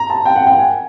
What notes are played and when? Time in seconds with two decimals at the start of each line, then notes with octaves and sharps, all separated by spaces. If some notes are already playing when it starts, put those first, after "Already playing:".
Already playing: A#5
0.10 A5
0.25 G5
0.36 F#5
0.47 G5
0.57 G#5